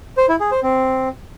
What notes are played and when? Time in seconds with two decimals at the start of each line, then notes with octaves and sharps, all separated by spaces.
0.17 C5
0.29 E4
0.40 G#4
0.51 C5
0.63 C4